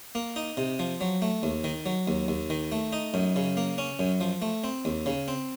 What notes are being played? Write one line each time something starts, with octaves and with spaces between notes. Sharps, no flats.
A#3
D#4
C3
F3
F#3
A3
D#2
D#3
F#3
D#2
D#2
D#3
A3
D#4
F#2
C#3
A#3
C#4
F#2
F3
A3
C4
D#2
C#3
C4